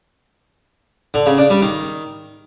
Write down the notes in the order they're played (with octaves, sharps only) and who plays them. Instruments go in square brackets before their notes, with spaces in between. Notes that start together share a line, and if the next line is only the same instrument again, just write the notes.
[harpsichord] D3
C#3
D4
G3
D#3